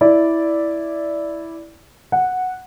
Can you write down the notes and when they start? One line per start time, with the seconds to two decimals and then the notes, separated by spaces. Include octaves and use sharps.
0.01 E4 D5
2.12 F#5